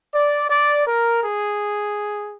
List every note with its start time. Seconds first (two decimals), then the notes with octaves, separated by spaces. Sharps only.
0.14 D5
0.50 D5
0.87 A#4
1.23 G#4